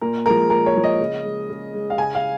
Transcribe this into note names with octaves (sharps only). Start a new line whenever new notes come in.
A#2 A#4
F3 G#3 A#4
A#2 A#4
C#5
F3 G#3
D#5
C#3
G#3
C#3
G#3
F5
C#3 G#5
F5